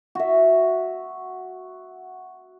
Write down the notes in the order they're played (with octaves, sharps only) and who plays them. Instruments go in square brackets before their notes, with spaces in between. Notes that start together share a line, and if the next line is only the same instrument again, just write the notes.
[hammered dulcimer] F#4 E5